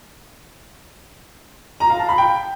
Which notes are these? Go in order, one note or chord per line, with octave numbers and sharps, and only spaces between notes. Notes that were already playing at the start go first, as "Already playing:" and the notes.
A#5
F5
A5
B5
G5